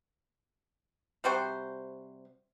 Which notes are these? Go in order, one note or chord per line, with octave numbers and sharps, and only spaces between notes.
C3 G3 F#4 C5